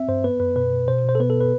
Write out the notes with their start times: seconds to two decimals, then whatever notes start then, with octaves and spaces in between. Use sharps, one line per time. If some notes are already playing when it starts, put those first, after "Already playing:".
Already playing: C4 E5
0.08 G2 C5
0.24 B3 B4
0.40 F#2 B4
0.56 B2 B4
0.73 B2
0.88 B2 C5
1.04 B2 C5
1.15 A4
1.20 B3 B4
1.30 A4
1.40 B4